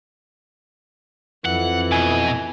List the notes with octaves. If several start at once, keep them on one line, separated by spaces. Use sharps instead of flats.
F2 E3 F#5
B2 G#5